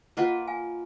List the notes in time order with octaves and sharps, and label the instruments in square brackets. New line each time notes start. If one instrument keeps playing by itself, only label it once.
[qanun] A#3 F4 B4 [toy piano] D#5 F#5
[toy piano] F5 G#5